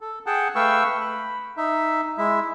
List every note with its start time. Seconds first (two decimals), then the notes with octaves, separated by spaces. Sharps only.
0.01 A4
0.26 G#4 F#5 G5 A5
0.55 A3 B4 F5 G5 C#6 E6
1.01 B5
1.57 D#4 E5
2.18 G#3 E4 E5